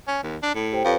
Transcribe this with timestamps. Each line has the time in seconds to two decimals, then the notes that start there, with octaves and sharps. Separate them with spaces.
0.08 C#4
0.23 D#2
0.42 D4
0.55 A2
0.72 G4 C5 G5
0.85 F2 B4 C#5 F5